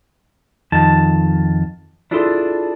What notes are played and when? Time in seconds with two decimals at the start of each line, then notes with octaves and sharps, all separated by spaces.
0.72 F2 D#3 A5
2.11 D4 E4 F4 G#4 A4 C5